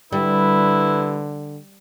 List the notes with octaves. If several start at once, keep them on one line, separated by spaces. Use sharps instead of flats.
D3 G3 E4 B4